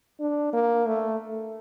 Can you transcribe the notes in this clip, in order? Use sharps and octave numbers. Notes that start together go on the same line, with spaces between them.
D4
A#3
A3